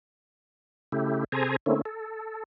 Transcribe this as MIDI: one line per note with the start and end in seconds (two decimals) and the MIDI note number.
0.92 1.24 49
0.92 1.24 57
0.92 1.24 64
0.92 1.24 67
1.32 1.56 48
1.32 1.56 68
1.32 1.56 69
1.32 1.56 72
1.32 1.56 80
1.32 1.56 82
1.66 1.81 50
1.66 1.81 57
1.66 1.81 58
1.66 1.81 60
1.66 1.81 61
1.66 1.81 64
1.85 2.43 69